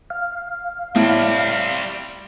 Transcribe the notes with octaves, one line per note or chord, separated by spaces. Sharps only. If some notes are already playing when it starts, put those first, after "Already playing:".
F5
A2 G3 C4